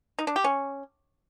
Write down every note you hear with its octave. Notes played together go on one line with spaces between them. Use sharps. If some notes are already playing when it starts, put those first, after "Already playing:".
D#4
D4
G4
C#4